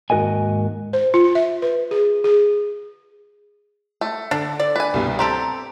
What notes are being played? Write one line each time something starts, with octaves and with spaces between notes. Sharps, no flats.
D#2 G#2 F#4 A#4 D#5 G#5
C5
F4
E5
B4
G#4
G#4
A3
D3 D4
D5
B4 G#5
C2 G2 B2
C4 G4 A4 A#5